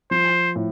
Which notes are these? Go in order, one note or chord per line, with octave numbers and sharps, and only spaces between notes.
F3 C5
A2